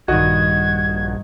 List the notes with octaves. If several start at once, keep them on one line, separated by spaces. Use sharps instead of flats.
A#1 G2 D#3 F#4 D#5 G#6